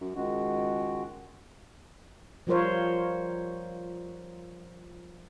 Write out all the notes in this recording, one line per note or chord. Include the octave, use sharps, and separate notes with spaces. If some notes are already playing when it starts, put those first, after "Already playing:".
F#2
C#2 D#3 G#3 F#4
F3 G3 F4 A#4 C5 C#5